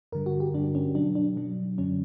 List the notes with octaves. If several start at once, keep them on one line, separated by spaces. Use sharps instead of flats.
G2 D3 G3 A#4
F#4
G4
G2 D3 G3 D4
C#4
B2 F#3 D4
D4
B2 F#3
F#2 D3 F#3 C#4